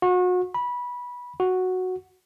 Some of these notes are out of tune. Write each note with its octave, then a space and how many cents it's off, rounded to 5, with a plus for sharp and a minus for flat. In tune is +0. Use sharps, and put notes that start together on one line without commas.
F#4 -35
B5 -15
F#4 -5